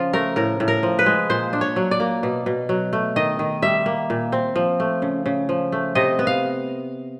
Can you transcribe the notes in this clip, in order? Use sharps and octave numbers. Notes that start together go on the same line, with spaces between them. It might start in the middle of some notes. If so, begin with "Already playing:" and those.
Already playing: C#3 F3 F4
A3 A#4
A2 A#4
A2
A#4
F3
B4
G#3
A#2 C5
D4
C#5
F#3
D5
A#3
B2
B2
F#3
A3
D#3 D#5
D#3
G3 E5
A#3
A#2
C4
F3
A3
C#3
C#3
F3
A3
C3 D#5
B3
F5